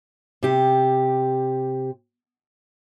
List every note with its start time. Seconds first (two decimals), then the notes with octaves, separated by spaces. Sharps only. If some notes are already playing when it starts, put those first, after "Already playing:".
0.43 C3 G4